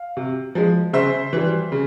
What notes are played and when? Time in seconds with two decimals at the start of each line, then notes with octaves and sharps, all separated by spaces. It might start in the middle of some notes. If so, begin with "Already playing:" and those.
Already playing: F5
0.17 C3
0.55 F3 G#3
0.93 C#3 C5 E5
1.33 E3 G3
1.72 C#3